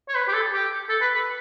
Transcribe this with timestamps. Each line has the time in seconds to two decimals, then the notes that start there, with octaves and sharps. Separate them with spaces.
0.09 C#5
0.15 B4
0.28 G4
0.33 A4
0.53 G4
0.89 A4
1.01 B4
1.14 B4